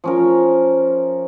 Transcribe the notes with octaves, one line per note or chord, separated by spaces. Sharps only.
F3 C#4 A#4